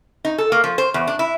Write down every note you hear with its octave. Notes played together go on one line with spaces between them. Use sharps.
D#4
A4
A#3
F3
C5
E2
D4
E4